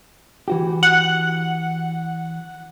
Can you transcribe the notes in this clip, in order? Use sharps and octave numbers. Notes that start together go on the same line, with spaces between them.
E3 F#4 G4
F#5